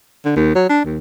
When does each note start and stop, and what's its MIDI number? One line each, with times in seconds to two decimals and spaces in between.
0.25 0.32 50
0.36 0.53 39
0.55 0.67 54
0.69 0.81 62
0.85 0.98 39